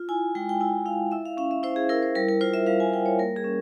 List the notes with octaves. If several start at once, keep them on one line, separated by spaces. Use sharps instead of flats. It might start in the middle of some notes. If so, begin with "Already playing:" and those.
Already playing: F4
E4 G#5
G#3 G5
G5
E4 G#5
E4 F5
E4 E5
F5
C#4 F5
E5
E4 C5
G#4
E4 A#4
C5
G3 A#4
A#4
F4 C5
E5
G3 F5
G#5
G3 G5
C#5
A#3 A#4
G#4
C#4